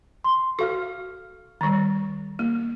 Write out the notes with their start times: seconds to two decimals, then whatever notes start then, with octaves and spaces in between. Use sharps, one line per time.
0.24 C6
0.59 F#4 A4 F5 F6
1.61 D#3 G3
2.39 A#3